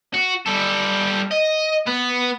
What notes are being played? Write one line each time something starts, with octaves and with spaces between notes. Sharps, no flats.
F#4
G3 A4
D#5
B3 B4